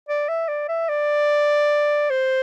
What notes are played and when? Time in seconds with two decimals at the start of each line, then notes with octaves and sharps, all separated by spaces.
0.09 D5
0.28 E5
0.48 D5
0.68 E5
0.89 D5
2.10 C5